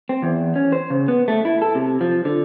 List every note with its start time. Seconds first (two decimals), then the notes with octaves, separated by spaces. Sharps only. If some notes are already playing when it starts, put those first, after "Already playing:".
0.09 C4
0.23 E2
0.56 C#4
0.72 C5
0.90 C#3
1.08 B3
1.28 A3
1.45 E4
1.62 A4
1.75 C3
2.01 F3
2.25 D3